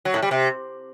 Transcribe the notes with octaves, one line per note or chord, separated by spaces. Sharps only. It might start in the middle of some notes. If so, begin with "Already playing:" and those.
F#3
A2
G3
C3